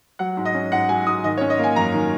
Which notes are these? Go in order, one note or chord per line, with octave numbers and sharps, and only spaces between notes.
F#3 F#5
G#2
D#5
C#4
G#2 F#5
F#3 G#5
G#2 D#6
D#3 D#5
C#5
C#4
D#5
A#3 G#5
F#2 A#5
D#3